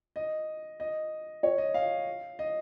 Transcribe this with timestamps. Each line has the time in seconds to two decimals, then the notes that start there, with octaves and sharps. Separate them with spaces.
0.16 D#5
0.80 D#5
1.43 C#5
1.58 D#5
1.74 F5
2.39 D#5